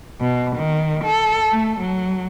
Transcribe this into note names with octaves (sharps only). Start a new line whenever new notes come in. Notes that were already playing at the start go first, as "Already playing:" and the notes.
B2
D#3
A4
A3
F#3